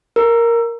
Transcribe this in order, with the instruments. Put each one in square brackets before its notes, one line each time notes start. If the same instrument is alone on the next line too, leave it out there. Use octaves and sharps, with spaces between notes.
[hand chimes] A#4